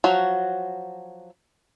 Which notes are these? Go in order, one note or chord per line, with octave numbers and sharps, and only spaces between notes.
F3 F#3 F#4